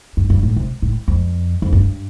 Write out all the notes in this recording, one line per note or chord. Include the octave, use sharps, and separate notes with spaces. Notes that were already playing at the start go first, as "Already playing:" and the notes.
G2
G2
A2
C3
A2
F2
F2
G2